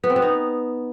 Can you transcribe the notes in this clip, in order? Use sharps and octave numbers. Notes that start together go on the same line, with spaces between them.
B3
C4
B3
D#4